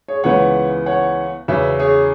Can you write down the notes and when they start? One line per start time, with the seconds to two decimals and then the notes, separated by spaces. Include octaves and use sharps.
0.08 G#4 C#5
0.24 C#2 C#3 E3 B3 C#5 F#5
0.86 C#5 F#5
1.48 E2 C#3 F#3 C#4 B4 E5
1.79 G#4 C#5